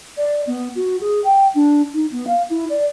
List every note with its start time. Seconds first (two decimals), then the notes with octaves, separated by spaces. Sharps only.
0.17 D5
0.47 B3
0.76 F#4
1.01 G#4
1.24 G5
1.55 D4
1.94 D#4
2.12 B3
2.27 F5
2.50 E4
2.70 D5